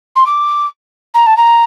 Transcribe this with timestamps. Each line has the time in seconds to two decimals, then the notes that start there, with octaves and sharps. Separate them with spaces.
0.15 C6
0.26 D6
1.14 A#5
1.26 A5
1.36 A#5